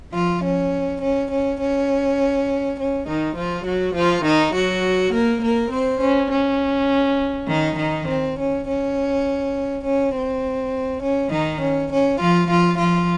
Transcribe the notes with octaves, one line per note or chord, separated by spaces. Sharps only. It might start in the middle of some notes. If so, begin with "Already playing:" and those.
F3 F4
C#4
C#4
C#4
C#4
C#4
D#3 D#4
F3 F4
F#3 F#4
F3 F4
D#3 D#4
F#3 F#4
A#3 A#4
A#3 A#4
C4 C5
C#4
C#4
D#3 D#4
D#3 D#4
C4
C#4
C#4
C#4
C4
C#4
D#3 D#4
C#4
C#4
F3 F4
F3 F4
F3 F4